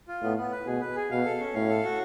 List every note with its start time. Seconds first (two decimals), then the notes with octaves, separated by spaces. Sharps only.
0.08 F4
0.23 A2 B3
0.37 B3
0.52 B4
0.67 B2 G#4
0.81 B4
0.96 G#4
1.10 B2 F5
1.25 A4
1.40 C#4
1.54 A2 F5
1.69 A4
1.84 F#4